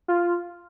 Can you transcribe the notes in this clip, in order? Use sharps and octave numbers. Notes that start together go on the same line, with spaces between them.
F4